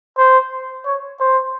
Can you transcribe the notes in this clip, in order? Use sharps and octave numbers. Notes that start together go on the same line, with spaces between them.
C5
C#5
C5